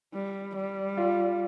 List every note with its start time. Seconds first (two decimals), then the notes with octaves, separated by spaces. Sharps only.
0.13 G3
0.56 G3
0.97 F4